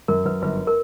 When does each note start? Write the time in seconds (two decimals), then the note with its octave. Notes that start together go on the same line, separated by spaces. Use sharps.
0.08 F#2 A#4
0.25 F#2 B4
0.42 G1 B4
0.67 A#4